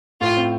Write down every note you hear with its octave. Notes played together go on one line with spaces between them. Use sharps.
A2 F4
C4